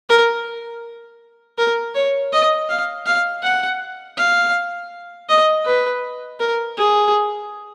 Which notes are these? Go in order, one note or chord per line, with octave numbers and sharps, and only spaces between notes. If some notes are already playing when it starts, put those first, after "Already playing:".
A#4
A#4
C#5
D#5
F5
F5
F#5
F5
D#5
B4
A#4
G#4